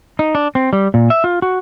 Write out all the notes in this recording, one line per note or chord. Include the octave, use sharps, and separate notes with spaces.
D#4
D4
C4
G3
A#2
E5
F4
F#4